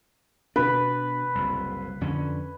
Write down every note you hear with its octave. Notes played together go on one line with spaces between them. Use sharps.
B2 D4 B4
F#1 C2
F2 D3 C#4